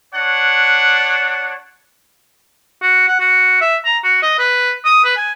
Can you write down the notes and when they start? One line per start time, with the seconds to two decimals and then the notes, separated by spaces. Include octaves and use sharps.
0.13 D4 C#5 F#5
2.82 F#4
3.08 F#5
3.20 F#4
3.61 E5
3.85 A#5
4.04 F#4
4.22 D#5
4.39 B4
4.85 D#6
5.04 B4
5.17 G#5